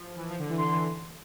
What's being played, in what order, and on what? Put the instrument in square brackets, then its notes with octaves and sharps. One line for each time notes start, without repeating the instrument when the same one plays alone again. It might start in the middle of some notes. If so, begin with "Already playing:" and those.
Already playing: [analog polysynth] F3
E3
F3
D3
E3
[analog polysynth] D3 [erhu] C6
[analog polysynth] E3